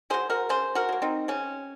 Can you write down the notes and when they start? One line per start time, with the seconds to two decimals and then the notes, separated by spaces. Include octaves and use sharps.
0.10 F#3 A#3 G#4 C5
0.30 F#4 A#4
0.49 C#3 G#4 C5
0.75 F#4 A#4
0.89 F#3 A#3
1.02 C4 D#4
1.28 C#3 C#4